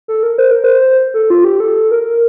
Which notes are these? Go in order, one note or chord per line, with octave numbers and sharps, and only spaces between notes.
A4
A#4
C5
A#4
C5
A4
F4
G4
A4
A#4